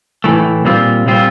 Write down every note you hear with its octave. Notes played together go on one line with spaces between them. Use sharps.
A2 E3 A3
A#2 G3 C4 F4
A#2 G3 C4 F4